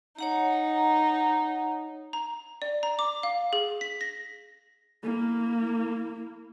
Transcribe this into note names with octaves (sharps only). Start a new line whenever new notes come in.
D#4 C#5 F#5 A#5
A#5
D5
A#5
D6
F5
G#4
B6
A#6
A#3 E4